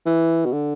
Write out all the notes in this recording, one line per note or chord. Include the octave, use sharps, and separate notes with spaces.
E3
B2
D3